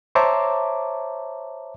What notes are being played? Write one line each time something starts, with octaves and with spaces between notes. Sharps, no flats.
C5 C#5 E5 A5 A#5 D6